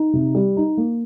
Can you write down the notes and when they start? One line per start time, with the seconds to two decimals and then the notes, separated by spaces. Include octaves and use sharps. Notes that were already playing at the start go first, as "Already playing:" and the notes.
Already playing: D#4
0.13 C3
0.34 G3
0.57 D#4
0.77 A#3